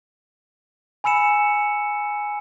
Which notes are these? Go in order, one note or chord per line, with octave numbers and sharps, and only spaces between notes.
G#5 B5 E6 C#7 E7